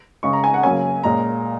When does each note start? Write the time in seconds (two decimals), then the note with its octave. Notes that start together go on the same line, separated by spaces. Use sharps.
0.23 C#3 G#3 C#4 C#6
0.33 A#5
0.44 G#5
0.54 F#5
0.63 C#3 F#3 A#3 C#4 G#5
1.03 A#2 G#3 C#4 A#5